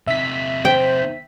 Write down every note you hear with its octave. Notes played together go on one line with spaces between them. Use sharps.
C3 D#4 E5 B6
C5 G5